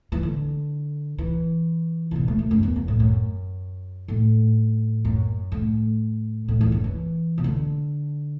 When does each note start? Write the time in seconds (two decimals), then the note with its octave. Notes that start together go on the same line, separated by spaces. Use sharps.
0.12 E3
0.23 D3
1.18 E3
2.11 A2
2.16 B2
2.28 A3
2.39 A3
2.51 F#2
2.63 E2
2.76 F#2
2.88 A2
3.00 F#2
4.08 A2
5.05 F#2
5.52 A2
6.48 A2
6.61 E2
6.72 F#2
6.84 E3
7.38 B2
7.44 D3